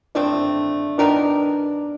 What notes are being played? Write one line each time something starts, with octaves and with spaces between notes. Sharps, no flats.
F3 A3 C4 D4
B3 D4 D#4 G4 A#4